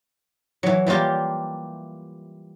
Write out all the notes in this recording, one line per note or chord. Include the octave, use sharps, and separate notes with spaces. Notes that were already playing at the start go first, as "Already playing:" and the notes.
E3 F#3
E3 G3 A#3 F4 G4